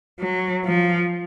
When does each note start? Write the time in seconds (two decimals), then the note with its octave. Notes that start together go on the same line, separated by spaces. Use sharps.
0.20 F#3
0.65 F3